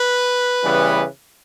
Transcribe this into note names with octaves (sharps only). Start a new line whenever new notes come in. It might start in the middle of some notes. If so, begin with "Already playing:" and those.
Already playing: B4
C#3 E3 G3 B3